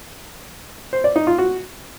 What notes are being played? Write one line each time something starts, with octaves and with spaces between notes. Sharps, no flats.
C5
D5
D#4
F4
F#4